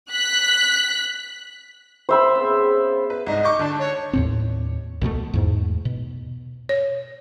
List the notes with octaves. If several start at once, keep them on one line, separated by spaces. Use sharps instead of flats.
F#6 B6
C5 E5 B5
C#3 B3 C4
B4
C2 G#2 D#5
C#6 D6 G6
D3 D4 A5
C#5
D#2 A2 C4
C2 B2 D#3 A3
E2 G#2
B2
C#5